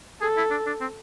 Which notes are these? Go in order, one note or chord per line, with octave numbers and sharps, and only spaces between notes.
G#4 A4
E4
D4
D4
C4